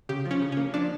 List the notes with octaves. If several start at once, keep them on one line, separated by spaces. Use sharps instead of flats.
C#3 G4
F3
C#4
C#3
A#3 C#4
F3 D4